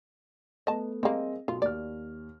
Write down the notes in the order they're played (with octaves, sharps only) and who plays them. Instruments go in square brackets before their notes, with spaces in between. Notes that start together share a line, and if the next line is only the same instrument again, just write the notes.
[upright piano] A3 B3 [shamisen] D#5 A5
[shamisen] G3 A#3 [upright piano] C4 G#4 D#5
[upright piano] B1 [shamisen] F4
[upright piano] D#2 F6 [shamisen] D5